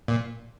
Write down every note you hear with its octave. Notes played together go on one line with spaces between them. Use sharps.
A#2